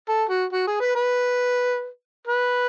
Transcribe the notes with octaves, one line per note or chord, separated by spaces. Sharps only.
A4
F#4
F#4
G#4
B4
B4
B4